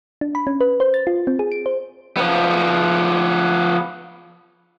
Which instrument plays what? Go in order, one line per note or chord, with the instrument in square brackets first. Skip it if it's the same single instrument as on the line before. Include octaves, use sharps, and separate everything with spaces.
[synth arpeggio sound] D4
B5
C#4
B4
C5
A6
F4
C4
G#4
D7
C5
[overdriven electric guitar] F3 B3